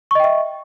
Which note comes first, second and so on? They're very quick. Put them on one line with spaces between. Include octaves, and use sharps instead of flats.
C#6 D#5 G5 E5